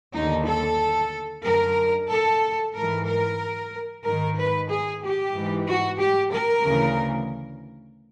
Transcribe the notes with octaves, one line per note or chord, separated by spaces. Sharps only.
D#2 D3 D#4
A4
F#2 D3 A#4
A4
G#2 E3 A#4
A#4
G#2 D#3 A#4
B4
G#4
G4
G#2 E3
F#4
G4
A#4
D2 C#3 E3